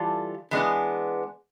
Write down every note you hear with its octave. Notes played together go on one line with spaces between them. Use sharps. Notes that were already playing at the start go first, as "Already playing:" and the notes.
Already playing: E3 G3 F4 A4
E3 G#3 B3 D4